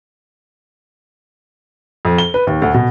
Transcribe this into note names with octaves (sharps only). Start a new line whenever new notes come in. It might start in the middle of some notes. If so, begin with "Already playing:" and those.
F2
G7
B4
D#2
D2
B2